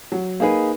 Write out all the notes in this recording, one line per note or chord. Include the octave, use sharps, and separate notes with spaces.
F#3
A#3 D#4 G#4 B4